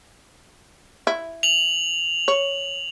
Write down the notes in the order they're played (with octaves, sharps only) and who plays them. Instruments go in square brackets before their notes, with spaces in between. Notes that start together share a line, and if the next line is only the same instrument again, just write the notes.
[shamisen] E4
[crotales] F7 F#7
[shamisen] C#5